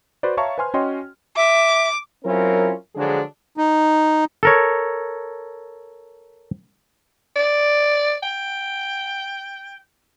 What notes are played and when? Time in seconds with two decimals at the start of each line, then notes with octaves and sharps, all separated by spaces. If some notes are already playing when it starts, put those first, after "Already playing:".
0.23 F#4 B4 C5 D5
0.37 C#5 E5 F5 A5 A#5 C#6
0.58 B4 C5 G#5 C6 F6
0.74 C#4 F#4 C#5 D#5 G5 C6
1.37 E5 D6
2.25 F#3 C4 C#4 E4 F4 A#4
2.96 D3 F3 F#3 G#3 D4 G#4
3.57 D#4
4.43 A4 A#4 C#5
7.36 D5
8.23 G5